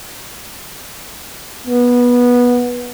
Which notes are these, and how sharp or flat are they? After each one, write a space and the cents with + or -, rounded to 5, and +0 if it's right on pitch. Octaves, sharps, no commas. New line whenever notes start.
B3 -15